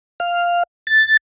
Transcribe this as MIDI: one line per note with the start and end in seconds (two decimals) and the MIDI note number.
0.20 0.63 77
0.87 1.17 93